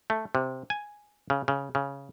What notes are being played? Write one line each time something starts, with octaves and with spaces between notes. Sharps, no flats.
A3
C3
G#5
C#3
C#3
C#3